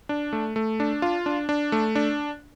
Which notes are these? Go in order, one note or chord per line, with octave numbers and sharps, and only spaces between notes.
D4
A3
A3
D4
F4
D4
D4
A3
D4